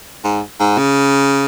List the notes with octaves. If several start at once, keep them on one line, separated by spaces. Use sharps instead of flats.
G#2
G#2
C#3